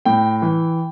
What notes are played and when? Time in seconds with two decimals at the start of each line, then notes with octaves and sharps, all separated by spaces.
0.05 A2 G5
0.42 E3